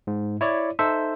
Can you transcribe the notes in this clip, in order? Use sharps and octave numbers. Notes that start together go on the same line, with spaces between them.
G#2
E4 C#5 D5
D#4 A4 C5 E5